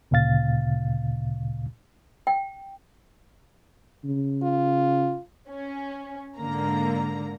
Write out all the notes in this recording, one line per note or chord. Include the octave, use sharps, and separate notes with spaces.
D2 A#2 C#3 F5 A6
G5
C#3
F4
C#4
G#2 D3 A#3 A#5